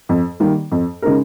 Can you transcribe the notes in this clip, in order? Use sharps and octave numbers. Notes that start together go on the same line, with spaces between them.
F2
D#3 G3 A#3
F2
C#3 G#3 D#4 A#4